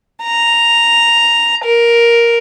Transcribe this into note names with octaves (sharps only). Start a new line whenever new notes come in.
A#5
A#4